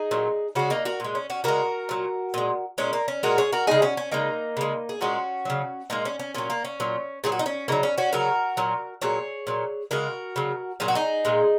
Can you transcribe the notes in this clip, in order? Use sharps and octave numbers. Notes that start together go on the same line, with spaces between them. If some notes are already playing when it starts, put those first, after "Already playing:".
Already playing: D#4 G#4
A#2 F#3
C#3 G#3 C#4 F#4
A#3 D#4
F#4 A#4
A#2 G#3
C#4
C#4 F#4
C#3 G#3 F#4 A#4
A#2 F#3
A#2 G#3
A#2 G#3 C#4
A#3
C#4
A#2 G#3 F#4 A#4
G#4 C#5
F#4 A#4
C#3 G#3 D#4 G#4
C#4 F#4
C#4
C#3 G#3 A#3 D#4
C#3 G#3
G#4
A#2 G#3 C#4 F#4
C#3 F#3
A#2 G#3 A#3 D#4
C#4
C#4
A#2 F#3 C#4
A#3
C#4
A#2 F#3
A#2 F#3 G#4
F#4
D#4
C#4
C#3 F#3 A#3 D#4
C#4
C#4 F#4
C#3 F#3 F#4 A#4
A#2 F#3
A#2 F#3 G#4 C#5
A#2 F#3
C#3 G#3 F#4 A#4
C#3 F#3
A#2 F#3 G#4
F#4
D#4 G#4
A#2 G#3